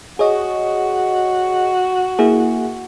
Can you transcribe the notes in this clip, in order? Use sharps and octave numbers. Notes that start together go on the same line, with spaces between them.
F#4 G#4 C#5 D#5
A#3 E4 G#4